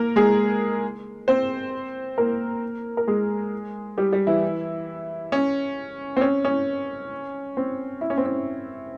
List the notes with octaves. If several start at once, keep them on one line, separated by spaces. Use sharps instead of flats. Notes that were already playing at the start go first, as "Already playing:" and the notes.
Already playing: A#3 A#4
G#3 G#4
C4 C5
A#3 A#4
A#4
G#3 G#4
G3 G4
G3 G4
E3 E4
C#4
C4
C#4
C#4
C4
E4
C#4
C4
C#4